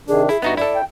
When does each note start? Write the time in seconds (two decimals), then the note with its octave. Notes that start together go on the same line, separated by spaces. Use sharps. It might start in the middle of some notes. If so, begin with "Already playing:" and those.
0.08 C3 D#3 D4 G#4
0.29 E4 G#4
0.42 G2 B3 D#4 F#4 E5
0.57 E4 A4 D5
0.75 G5